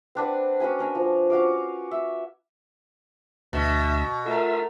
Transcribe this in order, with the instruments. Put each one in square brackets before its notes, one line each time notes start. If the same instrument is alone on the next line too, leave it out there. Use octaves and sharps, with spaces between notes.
[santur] C4 D4 B4 F#5
C#4 F#4 B4 G#5
D4 A#4 G#5
F3
C#4 F#4 F5 D6
E5
[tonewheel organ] D2 E5 [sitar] B2
[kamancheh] A3 A#4 [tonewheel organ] F4 E5